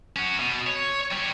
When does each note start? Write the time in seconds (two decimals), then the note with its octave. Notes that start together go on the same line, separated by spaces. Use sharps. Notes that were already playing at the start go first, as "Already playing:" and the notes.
0.16 C#4 F#4
0.39 B2
0.67 C#5
1.12 G3 C#5